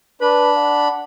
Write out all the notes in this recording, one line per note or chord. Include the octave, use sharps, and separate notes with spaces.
D4 B4 B5
F#5